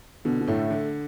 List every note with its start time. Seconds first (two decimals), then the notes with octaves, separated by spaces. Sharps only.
0.25 B2 D3
0.41 B2
0.47 A2 A3
0.70 D3